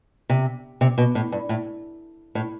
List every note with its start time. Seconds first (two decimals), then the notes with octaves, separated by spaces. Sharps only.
0.30 C3
0.81 C3
0.98 B2
1.15 A2
1.32 G2
1.49 A2
2.35 A2